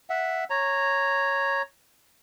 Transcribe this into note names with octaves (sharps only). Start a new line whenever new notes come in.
E5 F#5
C#5 A#5